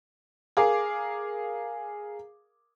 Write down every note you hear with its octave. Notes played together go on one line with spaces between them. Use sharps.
G#4 A#4 F5 D6